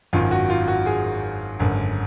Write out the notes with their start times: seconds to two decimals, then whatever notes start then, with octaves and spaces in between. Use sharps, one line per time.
0.13 G#1 F#2 D#3 F4
0.31 F#4
0.50 F4
0.68 F#4
0.86 G#4
1.60 G#1 F#2 D3